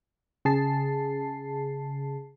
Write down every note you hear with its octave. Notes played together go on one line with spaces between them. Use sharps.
C#3 G#4 A5 C7